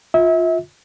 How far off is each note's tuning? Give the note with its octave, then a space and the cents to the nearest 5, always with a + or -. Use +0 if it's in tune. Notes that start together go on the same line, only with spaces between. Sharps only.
F4 +15 E5 -35